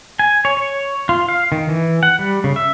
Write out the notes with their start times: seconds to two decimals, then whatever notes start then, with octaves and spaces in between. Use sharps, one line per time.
0.19 G#5
0.45 C#5
0.57 C#5
1.09 F4
1.29 F5
1.52 D#3
1.69 E3
2.03 F#5
2.19 G3
2.44 C#3
2.56 E5